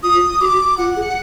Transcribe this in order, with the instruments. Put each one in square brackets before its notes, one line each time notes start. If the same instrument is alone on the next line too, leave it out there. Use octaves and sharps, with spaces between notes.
[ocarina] F4 [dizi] D#6
[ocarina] F#4 [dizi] D6
[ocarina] F4 [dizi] F#5
[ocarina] G#4